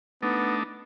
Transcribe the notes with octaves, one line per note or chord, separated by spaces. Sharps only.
A3 B3 D4 D#4